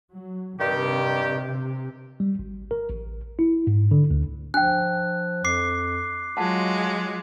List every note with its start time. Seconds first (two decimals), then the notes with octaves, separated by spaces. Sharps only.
0.11 F#3
0.60 G2 C3 D#3 G4
2.20 G3
2.39 G#1
2.71 A#4
2.90 A1
3.39 E4
3.67 G#2
3.91 D3
4.11 D2
4.54 F3 D4 G5 F#6
5.44 F2 D6 C7
6.37 F#3 G#3 F4 F#5 A5